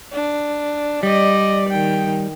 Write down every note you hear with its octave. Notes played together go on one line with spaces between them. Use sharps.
D4
G3 D5 D#5
D#3 G5